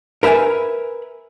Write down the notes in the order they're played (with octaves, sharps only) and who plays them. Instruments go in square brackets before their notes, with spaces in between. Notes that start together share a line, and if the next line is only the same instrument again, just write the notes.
[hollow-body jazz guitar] A#4 B4 E5 G5 G#5